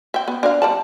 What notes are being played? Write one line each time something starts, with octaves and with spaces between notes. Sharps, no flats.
E5 G5
B3
D4 A#4 F5
G3 D5 A5